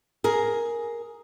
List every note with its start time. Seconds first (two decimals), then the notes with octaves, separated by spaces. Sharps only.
0.24 G#4 A#4